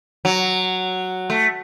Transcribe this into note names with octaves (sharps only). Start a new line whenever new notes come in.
F#3
A3